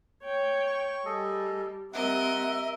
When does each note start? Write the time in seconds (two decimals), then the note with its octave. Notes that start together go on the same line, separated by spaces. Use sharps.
0.23 C#5 G5
0.67 C#6
1.05 G3 G#4 A4 D#5
1.93 G3 C4 A#4 D#5 E5 F#5